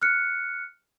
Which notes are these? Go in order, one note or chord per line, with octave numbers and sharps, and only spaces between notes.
F6 F#6 C#7